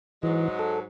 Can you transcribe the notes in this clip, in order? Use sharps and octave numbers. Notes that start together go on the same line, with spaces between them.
G#2 E3 F#3 G#3
A4